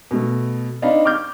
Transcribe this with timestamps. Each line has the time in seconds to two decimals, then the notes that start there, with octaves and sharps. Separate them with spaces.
0.11 B2 A3
0.82 C4 D4 D#4 F5 B5
1.05 D6 F6 G6